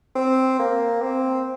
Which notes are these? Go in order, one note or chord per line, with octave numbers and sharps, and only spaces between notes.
C4
A#3
C4